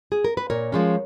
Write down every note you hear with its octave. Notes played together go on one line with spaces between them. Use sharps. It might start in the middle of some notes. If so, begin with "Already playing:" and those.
G#4
A#4
B4
A#2 A#4 C#5
F3 G#3 C#4